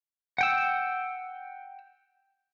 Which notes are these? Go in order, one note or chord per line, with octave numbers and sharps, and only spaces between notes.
F#5 G5 E6